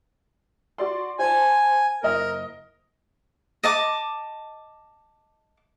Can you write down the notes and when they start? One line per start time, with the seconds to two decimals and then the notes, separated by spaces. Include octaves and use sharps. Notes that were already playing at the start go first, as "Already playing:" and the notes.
0.78 F#4 D5 C6
1.19 C5 G#5 A5
2.03 F#1 A#4 D#5
3.64 D#5 A5 D6